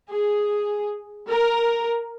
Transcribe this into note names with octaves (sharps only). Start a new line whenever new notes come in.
G#4
A#4